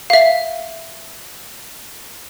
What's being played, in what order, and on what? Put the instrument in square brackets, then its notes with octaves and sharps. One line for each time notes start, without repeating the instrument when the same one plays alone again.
[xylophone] E5 F5